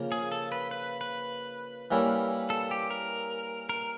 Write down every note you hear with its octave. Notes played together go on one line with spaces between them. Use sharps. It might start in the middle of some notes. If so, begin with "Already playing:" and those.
Already playing: C#3 F3 A#3
G#4
A4
B4
B4
B4
E3 G3 A#3 C#4 E4
A4
G4
A#4
A#4